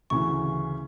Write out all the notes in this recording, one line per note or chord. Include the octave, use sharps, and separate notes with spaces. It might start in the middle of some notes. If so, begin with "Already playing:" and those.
D2 C#3 E3 C#6